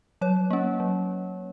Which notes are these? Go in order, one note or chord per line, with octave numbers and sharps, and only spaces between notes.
F#3 C#5
A#3 C#4
F#3